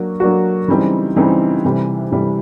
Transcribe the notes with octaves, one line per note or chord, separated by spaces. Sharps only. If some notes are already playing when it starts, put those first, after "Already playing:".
Already playing: F#3 A#3 D4 F#4
F#3 A#3 D4 F#4
C#3 E3 G3 C4 D#4
C#3 E3 G3 C4 D#4
C3 E3 G3
C3 E3 G3